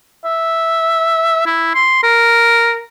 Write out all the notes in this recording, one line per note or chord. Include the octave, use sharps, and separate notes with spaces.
E5
E4
C6
A#4